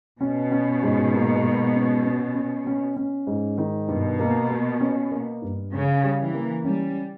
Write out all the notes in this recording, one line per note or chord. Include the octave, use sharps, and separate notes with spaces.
B2 C#4
C#4
G#2
A#3
G#2
C#4
C#4
C#4
C#4
C#4
G#2
D#3
G2 B2
A#3
A#3
C#4
A#3
G2
C#3 C#4
G3
E3
A#3
G3 C#4